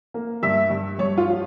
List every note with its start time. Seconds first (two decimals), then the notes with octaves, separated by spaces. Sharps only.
0.14 A#3
0.43 G2 E5
0.70 G2
0.99 G2 C#5
1.18 F4
1.27 F3